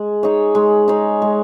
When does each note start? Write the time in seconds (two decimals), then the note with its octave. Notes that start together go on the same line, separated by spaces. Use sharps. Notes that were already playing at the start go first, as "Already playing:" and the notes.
Already playing: G#3
0.23 D#4 G#4 C#5
0.55 G#3
0.88 D#4 G#4 C#5
1.22 G#3